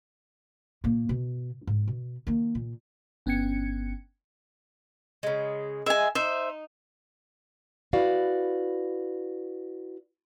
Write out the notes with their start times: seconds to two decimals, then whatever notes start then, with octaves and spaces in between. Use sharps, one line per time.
0.84 A#2 A#3
1.09 B2
1.67 G#2
1.88 B2
2.27 D#3 A#3
2.55 A#2
3.26 G1 B3 C#4 G5 G#6 C#7
5.23 C#3 G#3
5.86 G#3 E5 G#5
6.15 D#4 C5 E5
7.93 E4 F#4 B4 D5 F5